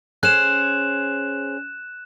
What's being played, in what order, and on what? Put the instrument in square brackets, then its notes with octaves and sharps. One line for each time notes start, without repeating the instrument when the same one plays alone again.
[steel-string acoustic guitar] C#4 G#4 C5 [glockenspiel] F#6 E7